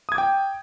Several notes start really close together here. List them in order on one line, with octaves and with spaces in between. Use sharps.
D#6 G#6 D6 G5